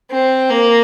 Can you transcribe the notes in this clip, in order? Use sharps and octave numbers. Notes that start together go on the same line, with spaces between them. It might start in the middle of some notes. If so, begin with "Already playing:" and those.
C4
A#3